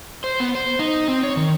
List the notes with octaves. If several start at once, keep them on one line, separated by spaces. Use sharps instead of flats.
C5
B3
C5
D#4
C4
C#5
D#3